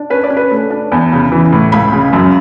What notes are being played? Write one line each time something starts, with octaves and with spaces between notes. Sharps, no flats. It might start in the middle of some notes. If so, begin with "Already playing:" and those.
Already playing: D4
C#4 B4
D5
C#4
B4
A3
D4
E2
C#3
E3
A2
C#2 B5
C#3
F#2